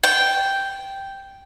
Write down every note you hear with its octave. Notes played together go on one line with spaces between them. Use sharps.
G5